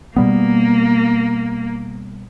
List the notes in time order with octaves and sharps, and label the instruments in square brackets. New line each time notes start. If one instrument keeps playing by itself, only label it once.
[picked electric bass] B2 G3 B3 [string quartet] A#3